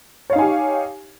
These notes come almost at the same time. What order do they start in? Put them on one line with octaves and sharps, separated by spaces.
C#5 F5 D#4 G#5 G4